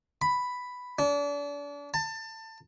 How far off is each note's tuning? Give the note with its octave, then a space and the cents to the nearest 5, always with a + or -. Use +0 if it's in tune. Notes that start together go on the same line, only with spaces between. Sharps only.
B5 +5
D4 -35
A5 +25